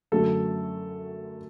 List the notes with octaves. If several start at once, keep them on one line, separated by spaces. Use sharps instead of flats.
F#2 D3 F#3 A3 A4